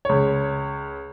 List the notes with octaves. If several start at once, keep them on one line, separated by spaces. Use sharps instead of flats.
C#2 C#5